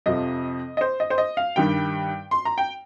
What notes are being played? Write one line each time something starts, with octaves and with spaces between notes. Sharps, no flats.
F2 C3 F3 D#5
D#5
C5
D#5
C5
D#5
F5
G2 D#3 G3 G5
C6
A#5
G5